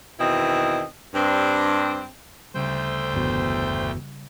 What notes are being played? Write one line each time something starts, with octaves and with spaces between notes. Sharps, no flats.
E2 B2 D#3 C4 E4 D#5
G2 C4 D4
D2 C#3 G3 A3 C5 G5
G1 E2 B2